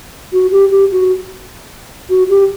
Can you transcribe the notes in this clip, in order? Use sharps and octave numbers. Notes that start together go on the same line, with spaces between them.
F#4
G4
G4
F#4
F#4
G4